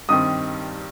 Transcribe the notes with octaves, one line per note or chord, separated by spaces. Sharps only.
G2 D#3 G3 C4 D#6